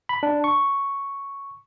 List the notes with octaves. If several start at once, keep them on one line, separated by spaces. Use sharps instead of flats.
B5
D4
C#6